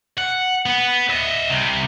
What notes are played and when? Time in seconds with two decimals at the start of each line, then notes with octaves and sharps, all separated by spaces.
0.18 F#5
0.66 B3
1.10 D#5 E5
1.50 C2 C3